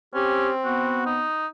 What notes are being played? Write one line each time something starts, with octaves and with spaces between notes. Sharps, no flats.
C4 C#4 G4
B3 F#4
D#4